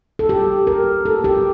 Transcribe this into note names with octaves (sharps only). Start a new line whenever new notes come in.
A4
G4
A#4
A4
G4